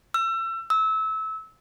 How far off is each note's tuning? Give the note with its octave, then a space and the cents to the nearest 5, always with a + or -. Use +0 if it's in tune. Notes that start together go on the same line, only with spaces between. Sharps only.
E6 +30
E6 -25